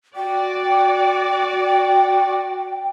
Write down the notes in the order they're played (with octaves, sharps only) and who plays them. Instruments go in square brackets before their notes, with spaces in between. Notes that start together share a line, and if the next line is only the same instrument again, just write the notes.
[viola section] F#4 D5 [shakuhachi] G5